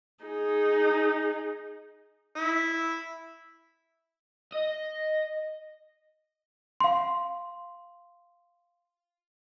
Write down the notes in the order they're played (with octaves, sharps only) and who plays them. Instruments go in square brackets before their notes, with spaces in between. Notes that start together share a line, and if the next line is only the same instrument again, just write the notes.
[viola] D#4 G#4
[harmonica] E4
[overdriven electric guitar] D#5
[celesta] F5 C6